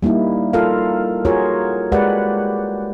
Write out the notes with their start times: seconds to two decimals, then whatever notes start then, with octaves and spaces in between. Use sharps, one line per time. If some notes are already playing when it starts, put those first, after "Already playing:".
0.02 G3 A#3 D#4 E4
0.53 F4 A4 A#4 F5
1.25 F4 F#4 G#4 A#4 C#5
1.92 G#3 G4 A#4 B4 D5 F#5